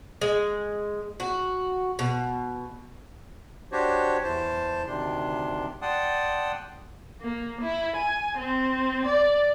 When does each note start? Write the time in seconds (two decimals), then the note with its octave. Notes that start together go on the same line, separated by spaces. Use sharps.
0.21 G#3
1.20 F#4
1.99 B2
3.72 D4 F#4 G4 C5 C#5
4.23 E2 E3 C5 A5
4.87 D2 C3 D#3 D4 C6
5.82 D5 F#5 G5 A5 C6 D#6
7.21 A#3
7.61 E4
7.96 G#5
8.38 C4
9.06 D5